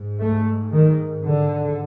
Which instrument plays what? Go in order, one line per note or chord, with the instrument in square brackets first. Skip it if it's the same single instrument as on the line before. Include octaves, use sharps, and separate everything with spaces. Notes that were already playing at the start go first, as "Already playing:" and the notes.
Already playing: [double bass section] G#2
A3
D#3
D3